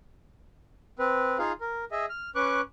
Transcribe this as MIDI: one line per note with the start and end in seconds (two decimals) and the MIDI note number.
0.99 1.38 60
0.99 1.38 71
1.39 1.52 63
1.39 1.52 65
1.39 1.52 68
1.39 1.52 77
1.61 1.85 70
1.91 2.06 68
1.91 2.06 75
1.91 2.06 76
2.09 2.30 89
2.35 2.61 61
2.35 2.61 71
2.35 2.61 85
2.35 2.61 86
2.35 2.61 90